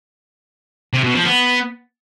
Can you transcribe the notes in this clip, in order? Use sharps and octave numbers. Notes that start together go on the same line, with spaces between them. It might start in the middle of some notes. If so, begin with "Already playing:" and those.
C3
B2
F3
B3